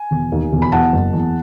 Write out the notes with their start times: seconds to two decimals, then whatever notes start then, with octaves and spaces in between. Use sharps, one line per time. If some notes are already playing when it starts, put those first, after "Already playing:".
Already playing: G#5
0.11 E1
0.32 D#2
0.52 E1
0.62 B5
0.72 E2 F#5 A5
0.93 F#1
1.13 E2